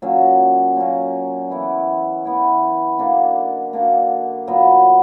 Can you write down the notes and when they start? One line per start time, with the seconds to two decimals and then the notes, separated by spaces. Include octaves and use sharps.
0.02 A#2 F#3 C#4
0.76 A#2 F#3 C#4
1.50 E3 B3 E4
2.25 E3 B3 E4
2.99 D3 A#3 D4 F#4
3.73 D3 A#3 D4 F#4
4.47 A#2 F#3 B3